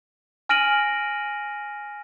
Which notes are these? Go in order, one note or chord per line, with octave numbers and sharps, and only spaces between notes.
G#5 F6 A#6 D7 D#7 F#7